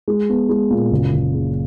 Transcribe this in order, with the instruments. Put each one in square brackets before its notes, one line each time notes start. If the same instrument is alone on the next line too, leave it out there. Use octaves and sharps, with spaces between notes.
[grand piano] G#3
B3
G#3
A#2
F#1
F#1
C#3